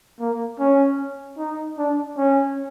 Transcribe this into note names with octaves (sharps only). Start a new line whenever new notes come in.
A#3
C#4
D#4
D4
C#4